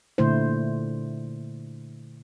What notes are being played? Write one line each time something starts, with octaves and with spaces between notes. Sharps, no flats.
A#2 D3 A3 E4 C5